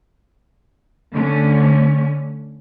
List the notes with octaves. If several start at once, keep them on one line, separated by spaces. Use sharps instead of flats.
D3 A3 C#4